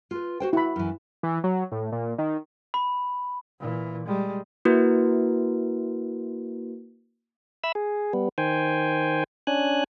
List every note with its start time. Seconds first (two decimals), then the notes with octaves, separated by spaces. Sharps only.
0.11 F4 B4
0.40 F#4 C5 G5
0.53 E4 F#4 B5
0.76 F#2 E3
1.23 E3
1.44 F#3
1.72 A2
1.92 A#2
2.18 D#3
2.74 B5
3.60 A#2 E3
4.07 G3 G#3
4.65 A#3 E4 F#4 A#4 B4
7.64 E5 B5 E6
7.75 G#4
8.13 G3 B3
8.38 D#3 C5 G5 G#5
9.47 C#4 D4 G#5 F#6